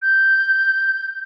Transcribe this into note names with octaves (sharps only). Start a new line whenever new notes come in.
G6